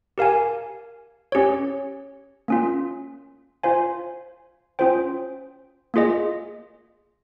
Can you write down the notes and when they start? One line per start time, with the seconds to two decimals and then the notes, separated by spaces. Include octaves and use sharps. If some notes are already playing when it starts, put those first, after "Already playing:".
0.18 G4 A#4 F5 G#5
1.32 C#4 G4 C#5
2.48 A#3 C#4 F4
3.63 F4 C5 F5 G#5
4.79 C#4 F4 C5 G5
5.94 A#3 F4 G#4 D#5